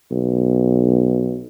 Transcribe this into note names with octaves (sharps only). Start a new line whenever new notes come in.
B1